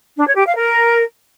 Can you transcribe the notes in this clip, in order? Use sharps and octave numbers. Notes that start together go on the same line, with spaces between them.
D4
C#5
G4
F5
A#4